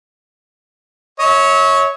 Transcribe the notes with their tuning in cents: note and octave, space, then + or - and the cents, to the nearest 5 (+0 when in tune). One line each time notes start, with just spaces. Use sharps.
C#5 +0 E5 -40